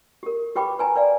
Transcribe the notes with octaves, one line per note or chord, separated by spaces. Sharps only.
G4 A#4
G4 B4 G5 B5 D6
B4 G#5 A#5
B4 D5 F5